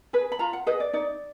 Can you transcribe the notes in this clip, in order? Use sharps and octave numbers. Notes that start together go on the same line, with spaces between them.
G#4 B4
B5
F4 A#5
F#5
G#4 B4 D#5
D5
D#4 D5